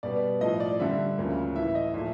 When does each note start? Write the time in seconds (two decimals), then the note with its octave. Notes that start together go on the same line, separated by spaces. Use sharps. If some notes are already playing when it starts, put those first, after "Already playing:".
0.03 B2 G3 B3 D5
0.41 A2 F3 A3 D#5
0.60 D5
0.79 G2 D3 G3 E5
1.18 D2 C#3 F3 A#3
1.55 A2 E3 A3 E5
1.75 D#5
1.94 A#2 F3 A3 E5